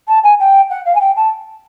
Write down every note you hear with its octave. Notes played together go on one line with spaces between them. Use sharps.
A5
G#5
G5
F#5
F5
G#5
G5
A5